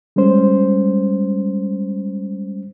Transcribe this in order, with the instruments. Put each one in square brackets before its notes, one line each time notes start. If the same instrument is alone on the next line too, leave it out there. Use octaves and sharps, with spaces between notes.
[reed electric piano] G3 G#3 C#4 C5